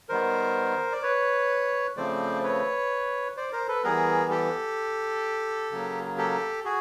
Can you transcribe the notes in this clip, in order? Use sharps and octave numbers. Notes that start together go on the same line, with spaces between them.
D#3 G3 B3 A#4 C5
D5
B4 C#5
C#3 F3 A3 C4 C5 D5
B4 C#5
C5 D5
A#4 C5
A4 B4
E3 G3 B3 G#4 A#4
G4 A4
C#3 F#3 A#3
G4 A4
F#4 G#4